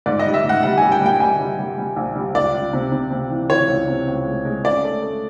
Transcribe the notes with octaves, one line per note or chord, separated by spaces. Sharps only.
G#2 D5
D#5
G3
E5
G#2
F#5
G3 F#5
G3 G#5
G5
G3
G5
G3 G#5
G3
G3
G3
A#1
G3
C#2 D5
C#2
C3
C3
C3
E3
E3 C#5
C#2
C3
C#2
G#3
G#3
C#4 D5
A3
A3